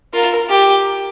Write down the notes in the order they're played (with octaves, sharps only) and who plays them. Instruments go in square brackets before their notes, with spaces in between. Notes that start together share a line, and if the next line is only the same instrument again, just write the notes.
[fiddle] F4 [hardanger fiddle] A#4
[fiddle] G4